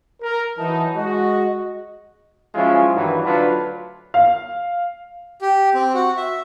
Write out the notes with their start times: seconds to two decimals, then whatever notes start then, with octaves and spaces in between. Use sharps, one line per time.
0.22 A#4
0.58 E3 F#3 D#4 A5
0.96 G#3 F#4 D#5
2.55 F3 F#3 G#3 C#4 E4 F4
2.94 G2 D#3 E3 F#3
3.24 D2 F#3 D4 F4 B4
4.14 F5
5.42 G4
5.75 C4
5.94 F#4
6.17 E5